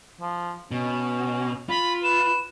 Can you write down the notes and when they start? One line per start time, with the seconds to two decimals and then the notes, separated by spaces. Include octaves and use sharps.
0.20 F3
0.71 B2 C#4
1.69 F4 B5
2.04 B4 E7